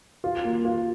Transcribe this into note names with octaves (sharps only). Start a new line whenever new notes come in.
F4
A#3
F4